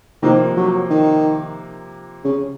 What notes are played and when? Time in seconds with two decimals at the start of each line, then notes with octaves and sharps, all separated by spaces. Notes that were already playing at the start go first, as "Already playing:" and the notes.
0.23 C3 D#3 F3 A#3
0.57 F#3
0.90 D#3
2.25 C#3